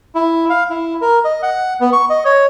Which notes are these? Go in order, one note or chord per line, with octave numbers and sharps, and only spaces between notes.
E4
F5
E4
A#4
D#5
F#5
B3
C#6
D#5
C#5